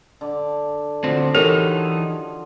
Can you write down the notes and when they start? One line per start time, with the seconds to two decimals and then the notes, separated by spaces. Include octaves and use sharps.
0.21 D3 D5
1.04 D2 F3 C4 F#4 D5
1.35 E3 D#4 G4 A4 A#4 C#5